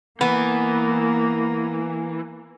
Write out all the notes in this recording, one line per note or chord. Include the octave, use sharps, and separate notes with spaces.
E3 A#3 B3